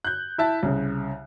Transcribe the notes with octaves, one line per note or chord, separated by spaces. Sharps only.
F#6 G6
E4 E5 A5
C2 C#3